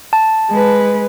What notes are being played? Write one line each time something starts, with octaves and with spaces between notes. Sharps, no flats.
A5
G#3 B4